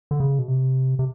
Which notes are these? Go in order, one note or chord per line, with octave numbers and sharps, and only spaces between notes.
D3
C#3
B2
C3
C3